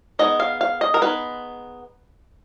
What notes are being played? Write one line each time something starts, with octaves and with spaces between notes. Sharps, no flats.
G#3 B3 D#4 D#5
F5
F5
D#5
A#4
G#3 B3 D#4 B4